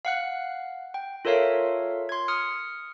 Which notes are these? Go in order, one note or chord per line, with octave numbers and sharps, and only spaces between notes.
F5 F#5 F#6
G5
F4 A4 A#4 C#5 E5 F5
C6 G#6
D#6 F6 C#7